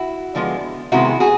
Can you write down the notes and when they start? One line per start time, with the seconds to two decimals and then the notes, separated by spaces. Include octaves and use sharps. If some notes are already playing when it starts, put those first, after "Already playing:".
Already playing: E4 F#4
0.35 D3 F3 G#3 B3
0.92 C3 D#3 G#3 B3 E4 F#4
1.20 F#4 G#4